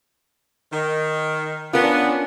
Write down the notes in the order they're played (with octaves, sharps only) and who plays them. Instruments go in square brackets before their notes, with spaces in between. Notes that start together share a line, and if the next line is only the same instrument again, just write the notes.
[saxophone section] D#3
[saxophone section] B3 [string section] C#4 D4 [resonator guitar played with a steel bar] F4 A#4